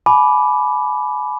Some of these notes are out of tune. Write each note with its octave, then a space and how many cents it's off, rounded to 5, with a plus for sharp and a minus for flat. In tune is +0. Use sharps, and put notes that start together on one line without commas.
G#5 +35 B5 +0 D6 +0